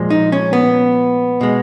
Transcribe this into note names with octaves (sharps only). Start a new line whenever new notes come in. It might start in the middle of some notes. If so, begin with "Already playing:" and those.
Already playing: A#2 F3 G#3
D#4
C#4
B3
B2 G#3